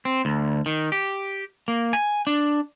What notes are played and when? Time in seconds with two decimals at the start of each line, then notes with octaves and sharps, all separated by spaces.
0.05 C4
0.25 D2
0.66 D#3
0.92 G4
1.68 A#3
1.93 G#5
2.27 D4